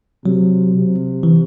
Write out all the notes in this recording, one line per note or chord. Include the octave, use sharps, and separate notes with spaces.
C3 F#3
C3
E3